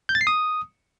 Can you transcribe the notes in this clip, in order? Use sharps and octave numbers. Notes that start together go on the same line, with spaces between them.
G6
A6
C7
D#6